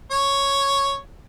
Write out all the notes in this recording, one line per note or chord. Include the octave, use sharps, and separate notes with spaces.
C#5